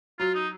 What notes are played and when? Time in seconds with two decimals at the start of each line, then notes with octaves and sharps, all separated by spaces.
0.19 F#3 F4
0.34 D#4